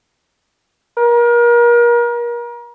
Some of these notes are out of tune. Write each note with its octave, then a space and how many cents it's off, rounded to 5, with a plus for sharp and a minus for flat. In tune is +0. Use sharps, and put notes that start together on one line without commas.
A#4 +35